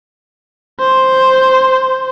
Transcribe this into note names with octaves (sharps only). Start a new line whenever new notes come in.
C5